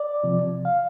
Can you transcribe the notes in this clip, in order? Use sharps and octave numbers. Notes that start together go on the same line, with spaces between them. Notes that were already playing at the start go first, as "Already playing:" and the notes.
Already playing: D5
C3 F3
F5